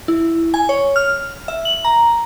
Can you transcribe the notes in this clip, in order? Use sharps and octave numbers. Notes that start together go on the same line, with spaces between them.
E4
G#5
C#5
F6
E5
F#7
A#5